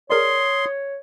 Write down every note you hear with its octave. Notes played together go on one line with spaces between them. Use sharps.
G#4 A#4 C#5 D5 C6 D#6